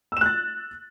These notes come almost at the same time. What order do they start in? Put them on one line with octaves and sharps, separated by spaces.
E6 E7 F#6 A6